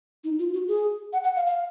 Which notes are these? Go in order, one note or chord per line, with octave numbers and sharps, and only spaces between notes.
D#4
F4
F#4
G#4
F#5
F#5
F5
F5